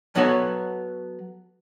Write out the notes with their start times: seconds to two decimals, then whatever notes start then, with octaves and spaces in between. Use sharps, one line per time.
0.15 F#3 B3 F#4 A4 C#5